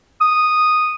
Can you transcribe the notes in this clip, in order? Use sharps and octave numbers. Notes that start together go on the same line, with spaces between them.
D#6